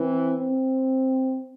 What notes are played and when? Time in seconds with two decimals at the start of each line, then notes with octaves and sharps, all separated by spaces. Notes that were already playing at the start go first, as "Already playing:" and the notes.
Already playing: E3 C4
0.38 C4